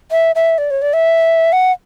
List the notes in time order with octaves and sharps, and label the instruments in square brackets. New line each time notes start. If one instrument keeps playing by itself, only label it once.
[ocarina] E5
E5
D5
C#5
D5
E5
F#5